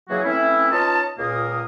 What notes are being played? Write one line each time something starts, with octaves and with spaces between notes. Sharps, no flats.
C#3 E3 F#3 A#3 F#4 G#4
E3 A3 C4 C#4 E4
C#4 D#4 F4 B4 D#5 A5
C#2 A#2 A#3 D#6